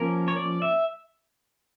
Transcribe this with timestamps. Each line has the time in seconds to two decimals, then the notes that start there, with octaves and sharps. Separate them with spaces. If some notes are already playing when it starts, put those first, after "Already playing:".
Already playing: F3 A#3 C#4 A#4
0.28 C#5
0.36 D5
0.62 E5